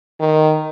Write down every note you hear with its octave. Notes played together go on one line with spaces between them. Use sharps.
D#3